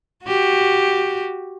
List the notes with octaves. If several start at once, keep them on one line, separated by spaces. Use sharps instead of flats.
F#4 G4